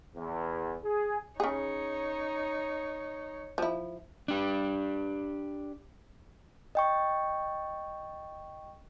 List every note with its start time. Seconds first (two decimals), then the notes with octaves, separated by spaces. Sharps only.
0.16 E2
0.84 G#4
1.40 C#3 D#4 G#4 C#5
3.58 F3 E4
4.28 D4 G4
6.75 D#5 G5 C#6